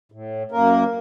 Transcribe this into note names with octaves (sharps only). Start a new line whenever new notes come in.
A2
F#2 A#3 A#4